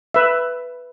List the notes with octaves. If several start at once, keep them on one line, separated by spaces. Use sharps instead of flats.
B4 E5